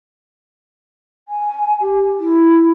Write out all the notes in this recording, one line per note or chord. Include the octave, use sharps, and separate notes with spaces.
G#5
G4
E4